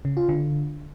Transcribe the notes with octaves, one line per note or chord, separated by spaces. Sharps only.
C#3
F4
D3